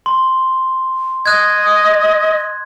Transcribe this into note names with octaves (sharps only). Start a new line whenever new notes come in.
C6
D#5 F#6 G#6